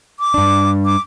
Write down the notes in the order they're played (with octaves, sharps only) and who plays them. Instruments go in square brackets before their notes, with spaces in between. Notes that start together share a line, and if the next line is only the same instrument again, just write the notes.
[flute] D6
[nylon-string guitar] G2 D4
[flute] D6